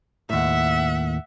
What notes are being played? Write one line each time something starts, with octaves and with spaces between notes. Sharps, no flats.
D#2 A2 E5 F#5